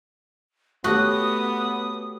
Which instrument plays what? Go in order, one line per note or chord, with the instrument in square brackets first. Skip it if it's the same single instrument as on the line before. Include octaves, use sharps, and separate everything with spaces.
[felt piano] A3 G4 C#5 [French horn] B3 [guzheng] F#4 [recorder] D#6